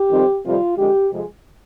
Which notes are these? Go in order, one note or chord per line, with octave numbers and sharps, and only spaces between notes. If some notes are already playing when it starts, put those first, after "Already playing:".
Already playing: G4
F2 D#3 G3 C4
F2 C3 D#3 G3 F4
F2 D3 G#3 G4
F2 C3 F3 G#3